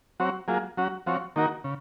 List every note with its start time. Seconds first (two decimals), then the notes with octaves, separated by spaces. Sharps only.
0.20 F#3 C4 F#4 C#5
0.48 F#3 A#3 F4 G#4
0.77 F#3 C#4 F#4
1.06 F3 C4 F#4 C#5
1.36 D#3 A#3 D#4 F#4 A#4
1.64 C#3